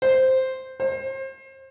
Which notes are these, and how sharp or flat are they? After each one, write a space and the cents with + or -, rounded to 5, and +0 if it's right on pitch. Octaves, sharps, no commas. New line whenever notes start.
C5 +0
C5 +35